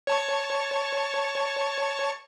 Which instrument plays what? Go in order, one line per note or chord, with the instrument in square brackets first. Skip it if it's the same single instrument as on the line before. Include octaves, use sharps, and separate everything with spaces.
[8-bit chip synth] C#5 A5 C#6